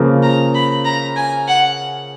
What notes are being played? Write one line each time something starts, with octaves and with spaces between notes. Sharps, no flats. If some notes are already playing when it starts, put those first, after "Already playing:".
Already playing: C#3 F3 A#3 F4
A#5
B5
A#5
G#5
F#5